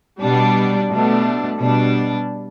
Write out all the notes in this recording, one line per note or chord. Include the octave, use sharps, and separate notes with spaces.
B2 G3 D4
B2 A3 D4
B2 G3 D4